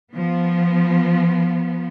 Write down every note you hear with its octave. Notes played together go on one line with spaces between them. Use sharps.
F3 B3